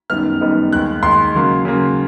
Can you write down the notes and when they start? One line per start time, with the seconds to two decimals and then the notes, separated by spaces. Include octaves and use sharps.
0.10 F#2 D#3 G3 B3 D#4 F6
0.40 F#2 D#3 G3 B3 D#4
0.73 D#2 D#3 G#3 F#6
1.03 D#2 D#3 G#3 C6
1.35 C#3 F#3 A#3
1.65 C#3 F#3 A#3